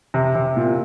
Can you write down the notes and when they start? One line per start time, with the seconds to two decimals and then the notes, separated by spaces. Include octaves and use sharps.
0.14 C3
0.35 C3
0.57 A#2